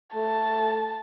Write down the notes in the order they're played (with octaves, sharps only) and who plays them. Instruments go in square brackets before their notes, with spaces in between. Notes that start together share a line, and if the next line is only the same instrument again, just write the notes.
[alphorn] A3 [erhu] A5